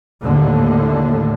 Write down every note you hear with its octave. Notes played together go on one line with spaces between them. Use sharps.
D#2 A2 D3